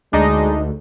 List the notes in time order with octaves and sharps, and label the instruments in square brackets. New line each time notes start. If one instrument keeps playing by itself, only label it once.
[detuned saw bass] D2 [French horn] G#3 [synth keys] D4 D#4 D#5